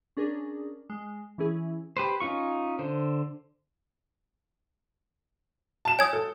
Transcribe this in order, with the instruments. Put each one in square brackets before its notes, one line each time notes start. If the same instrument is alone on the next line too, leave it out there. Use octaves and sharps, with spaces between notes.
[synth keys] C#4 D4 G#4 A#4
G#3
E3 C#4 E4 G#4
[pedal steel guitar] G4 B4 C5
C#4 D#4 F4 C#6
D3 C5
[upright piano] A5 E7
[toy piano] C#5 D#6 [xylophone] G#5 G#6
[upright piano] A4